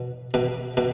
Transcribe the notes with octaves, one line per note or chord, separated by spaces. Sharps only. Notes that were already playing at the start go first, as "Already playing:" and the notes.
Already playing: B2
B2
B2